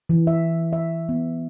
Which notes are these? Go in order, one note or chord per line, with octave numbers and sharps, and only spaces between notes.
E3
E5
E5
B3